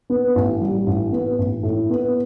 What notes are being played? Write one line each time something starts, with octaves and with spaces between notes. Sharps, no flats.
B3
A1
G3
A1
B3
A1
A2
B3